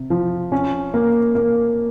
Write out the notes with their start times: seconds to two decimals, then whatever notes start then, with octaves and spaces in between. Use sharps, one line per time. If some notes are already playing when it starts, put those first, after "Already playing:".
Already playing: C3
0.10 F3
0.52 C#4
0.94 A#3
1.35 A#3